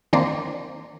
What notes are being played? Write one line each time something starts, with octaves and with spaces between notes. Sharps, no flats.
D#3 A#3 C4 D4 C5 D5